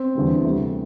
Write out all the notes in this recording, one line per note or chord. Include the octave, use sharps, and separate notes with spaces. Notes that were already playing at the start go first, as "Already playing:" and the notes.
Already playing: C4
E2 D3 G3
D2 C3 G3